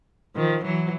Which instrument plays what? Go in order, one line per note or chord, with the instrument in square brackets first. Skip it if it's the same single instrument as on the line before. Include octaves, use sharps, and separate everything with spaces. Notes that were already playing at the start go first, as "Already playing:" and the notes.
[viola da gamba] D#3 F3
E3 F#3